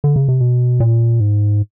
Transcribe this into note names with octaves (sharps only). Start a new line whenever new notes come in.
D3
C#3
C3
B2
A#2
G#2